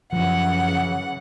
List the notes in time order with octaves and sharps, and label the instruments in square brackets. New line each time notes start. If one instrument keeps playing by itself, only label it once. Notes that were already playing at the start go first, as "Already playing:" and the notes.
[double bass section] F#2 C#3 E3 [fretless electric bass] F3 [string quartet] F#5